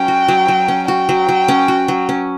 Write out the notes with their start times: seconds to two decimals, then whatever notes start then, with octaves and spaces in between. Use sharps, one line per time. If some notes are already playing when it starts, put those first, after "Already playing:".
Already playing: F#3 C#4 G5
0.08 F#4
0.28 F#3
0.48 F#3
0.68 C#4
0.88 F#4 G5
1.09 F#3
1.29 F#3
1.48 C#4
1.68 F#4
1.88 F#3
2.09 C#4